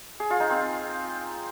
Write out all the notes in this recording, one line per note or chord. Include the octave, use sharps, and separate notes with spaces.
G#4
F4
D#4
C4